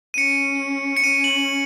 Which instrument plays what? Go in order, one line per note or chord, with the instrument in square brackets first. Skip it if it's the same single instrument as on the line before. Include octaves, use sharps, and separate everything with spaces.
[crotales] D#7
[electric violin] C#4 [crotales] C#7
[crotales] C#7
[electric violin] C#4 [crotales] D#7
[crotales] F#7